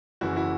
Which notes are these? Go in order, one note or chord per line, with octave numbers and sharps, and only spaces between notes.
F#1 F#2 C#3 E3 E4 F#4
E4 F#4